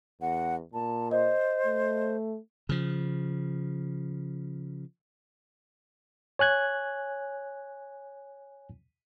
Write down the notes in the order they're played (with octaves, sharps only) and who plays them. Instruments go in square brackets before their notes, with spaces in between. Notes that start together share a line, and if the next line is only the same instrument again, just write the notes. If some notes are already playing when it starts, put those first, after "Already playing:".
[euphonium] E2 [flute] F#5
[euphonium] A#2 [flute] A5
[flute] C5 [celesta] D#5
[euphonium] A3
[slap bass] C#3 F3
[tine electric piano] C#5 G#5 F#6 G#6